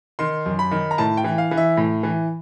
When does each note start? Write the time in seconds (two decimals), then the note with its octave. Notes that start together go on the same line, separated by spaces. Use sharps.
0.19 D#3 C6
0.46 F#2
0.59 B5
0.71 D#3
0.91 A#5
0.98 A2 A5
1.17 G5
1.24 E3
1.38 F5
1.51 E3
1.57 E5
1.77 A2
2.03 E3